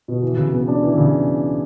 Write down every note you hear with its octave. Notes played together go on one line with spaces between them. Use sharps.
B2
E3
C#3
B3
D4
E3
C#3